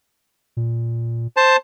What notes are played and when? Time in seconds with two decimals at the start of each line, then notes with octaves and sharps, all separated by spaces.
0.57 A#2
1.37 C5 A5